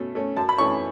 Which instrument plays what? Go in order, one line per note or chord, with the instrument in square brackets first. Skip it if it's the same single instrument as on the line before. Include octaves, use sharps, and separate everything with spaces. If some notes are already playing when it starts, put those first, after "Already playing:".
Already playing: [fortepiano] B2 A3 C#4
A3 C#4
F#2 A5
B5
E3 A3 C#4 C#6